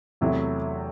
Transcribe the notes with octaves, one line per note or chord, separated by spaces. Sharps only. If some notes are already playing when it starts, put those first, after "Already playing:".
E2 C3 F#3 A3 E4